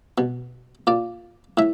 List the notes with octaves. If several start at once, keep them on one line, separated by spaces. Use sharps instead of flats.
B2
A#2 D5
A2 E5